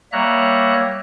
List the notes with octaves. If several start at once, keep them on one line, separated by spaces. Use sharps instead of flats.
G3 A#3 C#5 E5 A#5 F#6